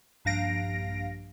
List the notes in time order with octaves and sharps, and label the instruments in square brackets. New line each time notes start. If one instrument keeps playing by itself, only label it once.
[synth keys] A#1 G2 F5 A#6 D7